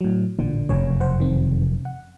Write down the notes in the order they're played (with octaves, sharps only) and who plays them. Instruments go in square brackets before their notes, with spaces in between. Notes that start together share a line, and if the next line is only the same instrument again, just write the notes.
[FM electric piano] A2 F#3
[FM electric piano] A1 A#2 [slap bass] D3
[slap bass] F1 F#2 C#3 [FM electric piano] C#5 G#5
[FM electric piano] C5 F#5
D#3 C4
F#5